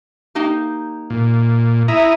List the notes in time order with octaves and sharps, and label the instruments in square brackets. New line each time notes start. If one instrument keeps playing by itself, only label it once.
[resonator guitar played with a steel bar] A#3 D#4 G4
[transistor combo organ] A#2
[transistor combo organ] E4 A#5 D#6 [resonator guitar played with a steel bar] E5